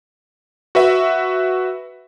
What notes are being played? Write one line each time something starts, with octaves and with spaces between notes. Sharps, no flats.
F#4 B4 E5